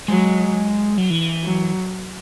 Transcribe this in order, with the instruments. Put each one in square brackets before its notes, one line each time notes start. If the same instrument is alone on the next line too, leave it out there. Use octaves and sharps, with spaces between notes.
[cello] F#3 [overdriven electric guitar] G#3
[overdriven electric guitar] F#3
E3
[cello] F#3